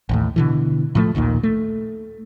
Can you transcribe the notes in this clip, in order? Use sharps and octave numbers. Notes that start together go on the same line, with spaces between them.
A1 D#2 A2
B2 D3 E3
A2 F3 A3
A#1 D#2 A#2 D#3
A3